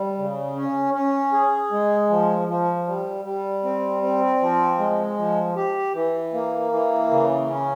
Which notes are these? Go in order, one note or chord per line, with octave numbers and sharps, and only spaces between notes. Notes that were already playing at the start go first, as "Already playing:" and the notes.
Already playing: G3
C#3
C#4
C#4
G#4
G#3
F3
F3
G3
G3
C4
C4
F3
G#3
F3
G4
E3
A#3
E3
C#3
C#4